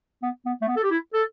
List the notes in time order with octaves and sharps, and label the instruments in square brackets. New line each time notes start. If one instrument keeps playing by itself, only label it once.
[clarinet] B3
B3
A3
B3
A4
G4
E4
A4